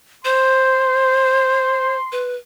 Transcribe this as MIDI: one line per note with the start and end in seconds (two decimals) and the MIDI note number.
0.25 1.96 72
0.25 2.30 84
2.12 2.36 71